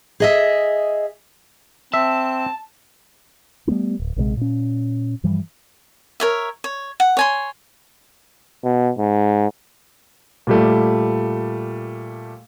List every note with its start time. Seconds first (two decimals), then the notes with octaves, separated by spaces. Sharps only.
0.20 G#4 D#5 E5
1.94 C4 E5 A5
3.67 G3 A3 B3 D4
4.00 D1
4.16 A#1 C3 G3 G#3
4.37 A#2 C#4
5.23 G2 E3 F3 G3
6.20 A#4 C#5 E5
6.64 C#5
7.00 F#5
7.17 C#5 G#5 C6
8.64 B2
8.99 G#2
10.47 A#2 G3 A3